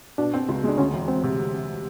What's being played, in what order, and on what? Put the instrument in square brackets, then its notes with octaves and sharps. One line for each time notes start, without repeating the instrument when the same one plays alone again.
[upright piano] B2 [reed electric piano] D4
[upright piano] C4
C#2
[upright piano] G#3 [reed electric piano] D4
[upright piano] D2 [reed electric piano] C#4
[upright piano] E1
[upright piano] E1 [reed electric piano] C4
[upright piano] C3